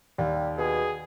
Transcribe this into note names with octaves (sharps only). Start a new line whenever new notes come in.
D#2 G3
B2 G#4